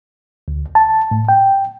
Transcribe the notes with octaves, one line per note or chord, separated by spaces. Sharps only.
D2
A5
A2
G5